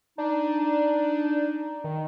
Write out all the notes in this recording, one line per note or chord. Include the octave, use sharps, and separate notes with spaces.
D4 D#4
D#3